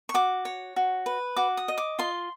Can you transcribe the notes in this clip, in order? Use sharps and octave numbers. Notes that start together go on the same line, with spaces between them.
C#6
F#4 D6
C#5
F#4
B4
F#4 D6
D#6
D#5
D6
F4 C6